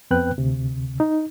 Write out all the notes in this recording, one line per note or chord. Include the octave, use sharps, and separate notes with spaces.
F2 B3 C4 B4 G5 F#6
D2 C3
D#4